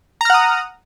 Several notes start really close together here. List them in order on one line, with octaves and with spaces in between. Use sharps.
A#5 F6 F#5 D#6